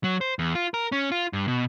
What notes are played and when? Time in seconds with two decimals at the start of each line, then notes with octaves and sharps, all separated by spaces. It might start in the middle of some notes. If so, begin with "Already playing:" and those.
0.04 F#3
0.21 C5
0.39 E2
0.55 F4
0.74 A#4
0.92 C#4
1.12 F4
1.33 G2
1.48 B2